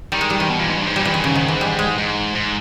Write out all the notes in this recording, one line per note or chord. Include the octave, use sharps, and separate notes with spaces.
D#3 G3
G#3
G3
E3
B2
A#2
G#2
G2
G#2
A#2 G3
E3
G#2 D#3
C#3
D#3
E3
G3
G#3
G#2
G#2